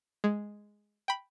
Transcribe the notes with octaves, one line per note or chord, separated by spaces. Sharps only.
G#3
G5 B5